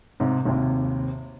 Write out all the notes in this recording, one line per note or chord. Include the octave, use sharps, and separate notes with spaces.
G#2 C3
G#1 D#2 C3